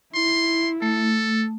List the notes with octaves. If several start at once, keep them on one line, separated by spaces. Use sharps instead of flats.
E4 C6
A3 A4